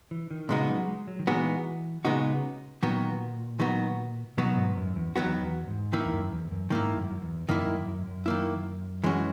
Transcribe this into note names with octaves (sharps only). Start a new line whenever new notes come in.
E3
D#3
A#2 C#3 G#3 B3 D#4 F#4
F#3
G#3
F#3
D#3
A#2 E3 G#3 B3 D#4 F#4
A#2 C#3 G#3 B3 D#4 F#4
A#2 D#3 F#3 B3 F#4
D#3 F#3 B3 F#4
B2 D#3 F#3 B3 F#4
G#2
F#2
E2
E2 D#3 F#3 B3 F#4
E2
G#2
D#3 A#3 E4
E2
F#2
E2
F#2
G#2 D#3 A#3 E4
F#2
F#2
E2
F#2 D#3 A#3 E4
F#2
F#2
F#2
D#3 A#3 E4
E3 G#3 C#4 F#4